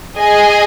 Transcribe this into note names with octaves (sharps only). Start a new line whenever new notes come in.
G#4 D#5 G#5